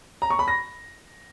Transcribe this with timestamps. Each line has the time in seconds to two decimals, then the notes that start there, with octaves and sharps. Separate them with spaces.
0.22 A#5
0.30 C#6
0.39 B5
0.48 A#6